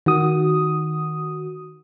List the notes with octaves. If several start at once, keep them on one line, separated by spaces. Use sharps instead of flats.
D#3 F#4 D#6